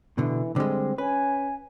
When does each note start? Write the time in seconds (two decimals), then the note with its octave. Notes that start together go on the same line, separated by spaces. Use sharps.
0.18 B2 D3 E3
0.56 D3 G3 G#3 C4
0.98 C#4 B4 G#5